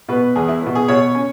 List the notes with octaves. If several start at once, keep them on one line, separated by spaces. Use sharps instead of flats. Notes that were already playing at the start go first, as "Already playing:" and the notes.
B2 B3 B4
E2 G#4
E4
B2 B3
G#4
B2 C#5
C#4